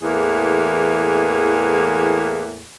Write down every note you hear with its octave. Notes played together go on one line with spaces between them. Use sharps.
E2 A2 E3 A#3 G#4